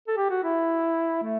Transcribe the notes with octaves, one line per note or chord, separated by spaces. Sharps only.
A4
G4
F#4
E4
A3